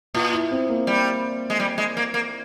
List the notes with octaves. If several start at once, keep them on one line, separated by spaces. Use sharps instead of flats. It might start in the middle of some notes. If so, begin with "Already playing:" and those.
A#2 F4
E4
C4
A#3
G3
G#3
G3
G#3
A#3
A#3